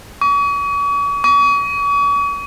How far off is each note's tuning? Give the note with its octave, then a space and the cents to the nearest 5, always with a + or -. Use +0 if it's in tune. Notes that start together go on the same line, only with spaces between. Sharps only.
C#6 +45
C#6 +45